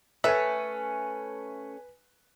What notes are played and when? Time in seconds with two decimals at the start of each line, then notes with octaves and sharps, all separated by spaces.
0.24 A3 C#4 B4 E5 G#5